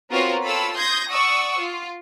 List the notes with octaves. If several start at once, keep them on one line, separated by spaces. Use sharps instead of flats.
B3 C4 F4 F#4 A#4 C#5
F4 A4 C#5 G5 B5 E6
C6 D#6 G6 G#6 A#6
D5 F#5 C#6 D#6 E6
F4